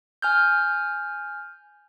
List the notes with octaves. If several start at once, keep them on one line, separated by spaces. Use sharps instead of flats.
G#5 F6 G6